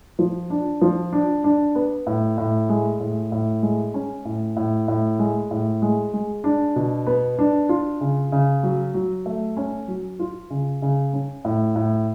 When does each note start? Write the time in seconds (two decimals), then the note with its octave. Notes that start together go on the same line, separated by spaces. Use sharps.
0.19 F3
0.50 D4
0.81 F3
1.13 D4
1.44 D4
1.75 B3
2.07 A2
2.38 A2
2.69 G#3
3.00 A2
3.32 A2
3.62 G#3
3.94 C#4
4.25 A2
4.57 A2
4.88 A2
5.19 G#3
5.51 A2
5.82 G#3
6.13 G#3
6.44 D4
6.76 B2
7.07 B3
7.39 D4
7.69 F4
8.01 C#3
8.32 C#3
8.63 F#3
8.94 F#3
9.26 A3
9.57 C#4
9.88 F#3
10.19 F4
10.50 C#3
10.82 C#3
11.13 C#4
11.45 A2
11.76 A2